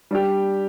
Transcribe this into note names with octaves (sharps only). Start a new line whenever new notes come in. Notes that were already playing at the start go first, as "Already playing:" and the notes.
G3 D4 G4